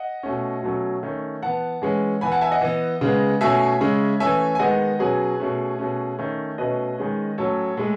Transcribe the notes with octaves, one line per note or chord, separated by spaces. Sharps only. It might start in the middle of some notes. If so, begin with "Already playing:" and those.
Already playing: D#5 F#5
B2 A3 C#4
B2 F#3 A3 C#4
D#3 A3 C#4
E3 B3 F#5 A5
E3 G#3 C#4
E3 B3 G#5 B5
F#5 A5
E5 G#5
D#5 F#5
E3 B3
C#3 G#3 B3
B2 A3 C#4 E5 G#5
C#3 G#3 C#4
E3 A3 C#4 E5 G#5
G#5
D#3 G#3 B3 D#5 F#5
B2 F#3 C#4 G#4 B4
B2 A3 C#4
B2 A3 C#4
D#3 A3 C#4
B2 A3 C#4 B4 D#5
D#3 G#3 C#4
A2 F#3 C#4 A4 C#5
A2 G#3